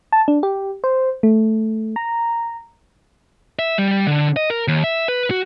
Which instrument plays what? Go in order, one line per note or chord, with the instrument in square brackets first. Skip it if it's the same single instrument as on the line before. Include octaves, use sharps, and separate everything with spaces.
[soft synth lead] A5
D4
G4
C5
A3
A#5
[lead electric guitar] E5
G3
D3
D#5
A#4
D#2
E5
B4
F#4